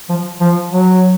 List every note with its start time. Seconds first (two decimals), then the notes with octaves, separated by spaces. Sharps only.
0.09 F3
0.40 F3
0.72 F#3